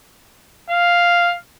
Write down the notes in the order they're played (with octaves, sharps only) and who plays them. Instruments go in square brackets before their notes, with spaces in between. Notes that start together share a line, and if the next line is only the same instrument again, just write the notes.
[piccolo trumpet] F5